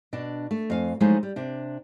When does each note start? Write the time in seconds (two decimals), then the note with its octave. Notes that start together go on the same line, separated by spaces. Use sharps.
0.13 B2 D4 A5
0.51 A3
0.70 F2 F5 G#5
1.00 F3 F#3 G#3 A3 D#4 E4
1.23 G3
1.36 C3 D4